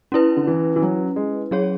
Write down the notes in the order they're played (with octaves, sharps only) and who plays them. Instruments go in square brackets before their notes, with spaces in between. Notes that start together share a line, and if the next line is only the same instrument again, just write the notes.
[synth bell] C#4 E4 B4
[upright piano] D3
E3
E3
F#3
G#3
[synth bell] F#3 C#4 G#4 C#5